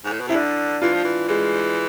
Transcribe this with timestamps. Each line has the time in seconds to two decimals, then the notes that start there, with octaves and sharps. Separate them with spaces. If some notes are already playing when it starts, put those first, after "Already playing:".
0.05 G#2
0.12 A2
0.20 B2
0.28 C3 E4
0.35 D3 D4
0.82 E3 F4
0.94 F3
1.04 E3
1.28 E3 G#3